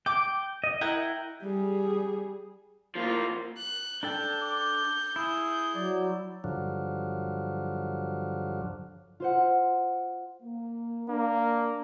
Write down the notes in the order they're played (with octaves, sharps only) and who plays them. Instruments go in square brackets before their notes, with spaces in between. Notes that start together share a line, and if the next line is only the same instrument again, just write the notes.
[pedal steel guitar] G5 [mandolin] D6
[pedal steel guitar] D#5
[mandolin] E4 A#4 F#5 [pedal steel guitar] G5
[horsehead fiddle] G3 G#4
[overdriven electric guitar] A2 F3 [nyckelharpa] A#3 F4
[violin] F#6
[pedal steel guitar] D4 A4 G5 [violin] G6
[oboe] D6
[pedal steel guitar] E4 [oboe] G#4
[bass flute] F#3 [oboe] D5
[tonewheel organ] G2 D3 F3 F#3
[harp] F4 C5 F#5
[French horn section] A#3
[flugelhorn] A#3 [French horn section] D4